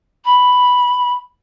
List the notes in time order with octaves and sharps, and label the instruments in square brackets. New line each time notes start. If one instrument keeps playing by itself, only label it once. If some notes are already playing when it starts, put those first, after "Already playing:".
[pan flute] B5